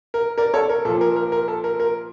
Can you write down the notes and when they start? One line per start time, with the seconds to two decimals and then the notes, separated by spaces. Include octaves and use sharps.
0.14 A#4
0.38 A#4 D5
0.54 A4 C#5
0.69 A#4
0.85 A#2 A4
0.88 F3
1.01 A#4
1.16 A#4
1.32 A#4
1.48 A4
1.64 A#4
1.80 A#4